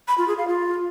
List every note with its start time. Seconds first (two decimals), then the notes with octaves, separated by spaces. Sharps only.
0.08 B5
0.18 F4
0.28 G#4
0.38 F5
0.48 F4